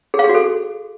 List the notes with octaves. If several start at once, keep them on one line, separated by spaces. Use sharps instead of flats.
G#4
F5
G#4
F#4
A4